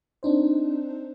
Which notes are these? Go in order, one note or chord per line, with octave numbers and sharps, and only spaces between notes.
C4 D4 D#4 C5